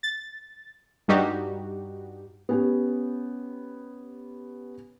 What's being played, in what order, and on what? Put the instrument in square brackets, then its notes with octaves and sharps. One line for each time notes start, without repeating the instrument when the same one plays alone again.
[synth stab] A6
G2 G3 D#4 F#4 G4
[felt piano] B3 C#4 G4